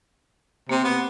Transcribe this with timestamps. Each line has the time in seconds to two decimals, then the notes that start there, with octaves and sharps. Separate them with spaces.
0.69 C3 A#3 C4
0.84 B3